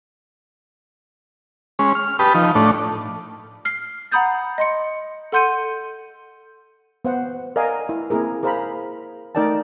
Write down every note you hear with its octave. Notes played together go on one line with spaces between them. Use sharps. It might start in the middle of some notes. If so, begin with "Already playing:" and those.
G#3 C#4
F6
G4 B4 A5 D#6
F3 D#4
A2 A3 D4
F6 C7
F#5 A#5 B5 D#6 G6 A6
D#5 C6 C#7
A4 F#5 C6 G6 C#7 D#7
B3 C5 F#5
A#4 D5 D#5 F5 F#5 G#5
E4
A#3 C4 E4 G#4 A#4
G#4 A#4 C5 F5 A#5 B5
A3 D#4 A#4 D5 G5 A5